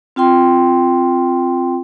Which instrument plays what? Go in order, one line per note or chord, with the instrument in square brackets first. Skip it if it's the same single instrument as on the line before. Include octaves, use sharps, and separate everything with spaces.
[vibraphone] C4 F4 G5 C6